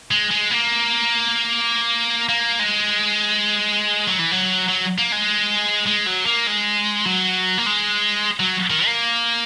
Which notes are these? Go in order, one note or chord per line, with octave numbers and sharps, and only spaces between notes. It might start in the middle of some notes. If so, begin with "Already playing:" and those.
G#3
G#3
A#3
A#3
G#3
F#3
E3
F#3
F#3
A#3
G#3
G#3
F#3
A#3
G#3
F#3
A#3
G#3
F#3
D#3
A#3